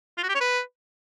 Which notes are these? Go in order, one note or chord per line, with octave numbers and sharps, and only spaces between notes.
F4
F#4
G4
C#5
B4